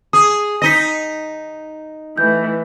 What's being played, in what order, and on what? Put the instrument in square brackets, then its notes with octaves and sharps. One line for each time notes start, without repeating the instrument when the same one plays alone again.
[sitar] G#4 [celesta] D#6
[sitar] D#4 D#5 [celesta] A#6 B6
[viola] E3 A3 [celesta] G6